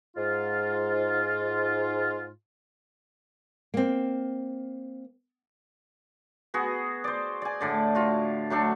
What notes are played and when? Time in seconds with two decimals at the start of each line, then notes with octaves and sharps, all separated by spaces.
0.17 G#2 F4
3.74 A#3 C4
6.54 B3 F#4 G#4
7.04 C5 D5
7.42 D5 G#5
7.60 A2 D3 D5
7.95 F4 F#4
8.50 F#3 A3 D4 A4